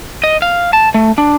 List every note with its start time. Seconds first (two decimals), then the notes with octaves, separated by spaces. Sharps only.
0.24 D#5
0.42 F5
0.73 A5
0.94 A3
1.18 D4